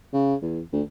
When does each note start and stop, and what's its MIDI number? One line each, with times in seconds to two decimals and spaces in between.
0.14 0.35 49
0.42 0.61 40
0.73 0.82 38